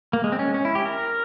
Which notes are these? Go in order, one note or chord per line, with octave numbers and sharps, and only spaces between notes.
A#3
G#3
C4
C#4
C#4
E4
G4
A#4